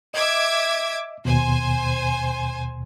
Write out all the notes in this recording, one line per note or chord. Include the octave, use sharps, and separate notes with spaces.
D#5 E5 D6 G#6
D#2 B2 C5 G#5